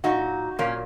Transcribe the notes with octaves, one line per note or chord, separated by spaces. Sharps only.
A#2 F#3 D#4 F#4
A#2 F#3 A#3 C#4